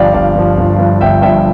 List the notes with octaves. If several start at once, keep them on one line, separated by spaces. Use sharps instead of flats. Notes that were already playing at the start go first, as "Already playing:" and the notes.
Already playing: G1 G2 F3 D5 F5 G5
G1 D5 F5
G2 F3
G1
G2 F3
G1 E5 G5
G2 F3 E5 G5